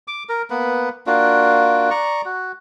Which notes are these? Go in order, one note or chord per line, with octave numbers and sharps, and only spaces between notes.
D6
A#4
A#3 B3 B4
A#3 D4 F4 F#4
D5 A#5 C#6
F#4